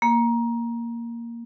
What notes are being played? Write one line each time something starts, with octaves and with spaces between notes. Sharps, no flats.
A#3